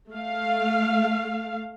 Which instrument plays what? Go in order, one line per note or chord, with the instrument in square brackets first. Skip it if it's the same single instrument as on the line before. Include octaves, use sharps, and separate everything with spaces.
[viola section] A3 F5